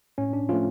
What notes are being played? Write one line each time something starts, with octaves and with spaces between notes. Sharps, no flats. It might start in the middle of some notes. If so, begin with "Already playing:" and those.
A2 C#4
D4
F3 A3 C#4 F4